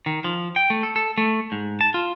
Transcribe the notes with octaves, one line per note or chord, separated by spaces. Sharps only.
D#3
F3
G5
A3
A4
A4
A3
G#2
A5
F4